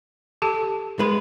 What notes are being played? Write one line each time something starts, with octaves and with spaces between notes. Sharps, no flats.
G4 A4 A5
G#3 B4